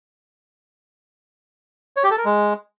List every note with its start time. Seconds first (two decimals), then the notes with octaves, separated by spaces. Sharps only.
1.96 C#5
2.04 G4
2.11 A4
2.18 A#4
2.25 G#3